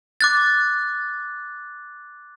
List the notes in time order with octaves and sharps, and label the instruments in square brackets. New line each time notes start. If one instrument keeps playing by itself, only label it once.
[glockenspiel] D6 F#6 A6